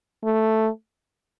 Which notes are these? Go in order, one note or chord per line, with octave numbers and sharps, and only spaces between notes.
A3